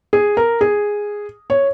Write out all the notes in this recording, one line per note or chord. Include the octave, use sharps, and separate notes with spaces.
G#4
A#4
G#4
C#5